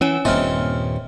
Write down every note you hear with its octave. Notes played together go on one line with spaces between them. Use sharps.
E3 C#4 C#5 G#5
D#1 G2 A#2 C4 C#4 D#4 E5 F6